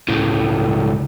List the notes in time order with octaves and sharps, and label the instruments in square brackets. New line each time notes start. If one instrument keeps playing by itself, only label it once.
[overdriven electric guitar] C#2 A2